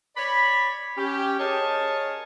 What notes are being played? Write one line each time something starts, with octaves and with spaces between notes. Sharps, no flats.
C#5 D5 B5
C#4 G4
G#4 A#4 C#5 D#5 A5